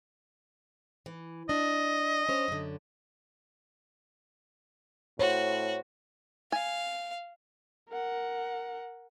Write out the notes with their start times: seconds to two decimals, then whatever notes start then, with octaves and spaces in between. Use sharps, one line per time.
1.06 E3
1.49 D4 D#5
2.29 C#4 C5
2.48 F#2 D3
5.19 A2 F#4 C5 C#5
6.52 F5 G#5
7.89 A#4 F#5